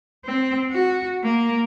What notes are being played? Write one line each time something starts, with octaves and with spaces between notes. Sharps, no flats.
C4
F#4
A#3